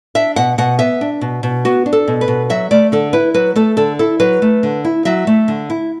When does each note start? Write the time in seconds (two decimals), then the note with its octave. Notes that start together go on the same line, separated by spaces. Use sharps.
0.15 D4 E5
0.36 B2 F#5
0.58 B2 F#5
0.79 B3 E5
1.01 D4
1.21 B2
1.43 B2
1.65 B3 F#4
1.86 D4
1.93 A4
2.08 B2
2.21 B4
2.28 B2
2.50 F#3 E5
2.71 A3 D5
2.92 D3 A4
3.13 E4 B4
3.34 F#3 B4
3.56 A3 A4
3.77 D3 A4
3.99 E4 A4
4.20 F#3 B4
4.42 A3
4.63 D3
4.85 E4
5.05 F#3 E5
5.27 A3
5.48 D3
5.70 E4